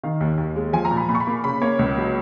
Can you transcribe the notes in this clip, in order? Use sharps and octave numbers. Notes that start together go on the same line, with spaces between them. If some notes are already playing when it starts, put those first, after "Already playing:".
D#3 F5
D#2
D#2
G#3
F3 G#5
A#5
A#2
B5
A#2 B5
C#6
B5
A#3
C#3 B5
A#3 C#5
C#2
F#3